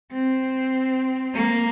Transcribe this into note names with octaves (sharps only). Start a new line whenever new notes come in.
C4
A#3